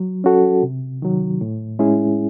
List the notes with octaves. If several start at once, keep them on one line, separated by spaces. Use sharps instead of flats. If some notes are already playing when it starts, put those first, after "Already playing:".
Already playing: F#3
C#4 F#4 A4
C3
D#3 F#3
A2
G#3 C#4 E4 G#4